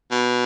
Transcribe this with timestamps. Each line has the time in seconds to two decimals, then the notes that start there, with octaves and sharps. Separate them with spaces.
0.11 B2